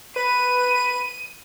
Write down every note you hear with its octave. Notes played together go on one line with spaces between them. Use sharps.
B4 D#7